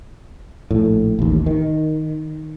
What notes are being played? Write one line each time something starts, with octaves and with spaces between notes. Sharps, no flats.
A#1 A2
A1 D#2
D#3